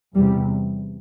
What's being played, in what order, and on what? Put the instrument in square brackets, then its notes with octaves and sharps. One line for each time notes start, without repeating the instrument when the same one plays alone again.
[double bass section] E2 C3 G3